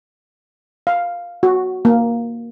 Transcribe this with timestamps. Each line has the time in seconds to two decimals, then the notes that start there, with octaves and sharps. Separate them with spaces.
0.87 F5
1.43 F#4
1.85 A#3